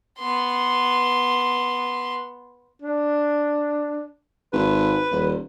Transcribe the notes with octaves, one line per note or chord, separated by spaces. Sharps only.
B3 C6
D4
G#1 B4
D#1